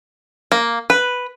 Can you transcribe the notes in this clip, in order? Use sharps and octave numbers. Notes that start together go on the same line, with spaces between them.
A#3
B4